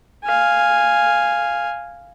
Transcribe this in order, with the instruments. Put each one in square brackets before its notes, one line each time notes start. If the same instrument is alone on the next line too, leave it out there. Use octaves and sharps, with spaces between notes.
[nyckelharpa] F5 G#5